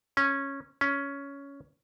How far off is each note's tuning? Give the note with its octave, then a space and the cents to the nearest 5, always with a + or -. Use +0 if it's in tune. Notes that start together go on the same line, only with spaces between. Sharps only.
C#4 -10
C#4 +10